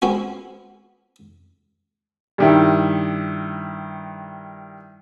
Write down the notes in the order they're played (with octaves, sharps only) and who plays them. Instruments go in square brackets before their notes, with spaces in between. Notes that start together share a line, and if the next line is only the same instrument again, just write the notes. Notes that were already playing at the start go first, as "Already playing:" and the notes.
[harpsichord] G#3 B3 C4 F#4
[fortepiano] G2 D#3 E4